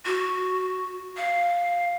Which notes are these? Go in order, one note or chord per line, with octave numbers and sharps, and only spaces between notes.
F#4
F5